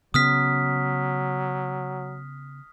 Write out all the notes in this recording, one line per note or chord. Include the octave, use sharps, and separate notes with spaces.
C#3 F#3 B3 C#4 D#6 F6 B6